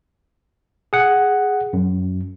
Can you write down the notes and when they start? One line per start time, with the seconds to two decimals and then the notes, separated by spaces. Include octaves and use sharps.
0.93 G#4 F#5
1.73 F#2